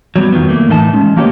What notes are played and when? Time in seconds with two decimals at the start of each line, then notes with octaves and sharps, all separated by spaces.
0.16 F#3 G3 B3
0.32 F2 D#3 F3 F#3 B3
0.49 A3 A#3
0.69 A2 E3 D#4 D#5 A5
0.93 G#3 C#4
1.16 F3 A#3 B3 G4 C#5 D#5